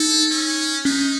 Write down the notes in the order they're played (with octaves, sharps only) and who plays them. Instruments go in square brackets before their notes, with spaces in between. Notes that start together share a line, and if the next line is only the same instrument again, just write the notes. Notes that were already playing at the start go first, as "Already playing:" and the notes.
Already playing: [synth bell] D#4 [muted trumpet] A4
[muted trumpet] C#4
[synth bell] C#4 [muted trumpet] D#4